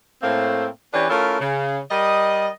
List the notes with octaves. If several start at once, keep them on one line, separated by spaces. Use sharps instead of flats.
A2 A3 A#3 C4
E3 C#4 D4 G4 B4
A3 C#4 E4 F4 A#4
C#3
G3 A#4 D#5